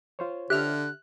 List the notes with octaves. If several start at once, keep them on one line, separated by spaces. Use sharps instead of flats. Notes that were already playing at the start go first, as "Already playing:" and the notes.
F4 C5 C#5
D3 G4 E5 F6 F#6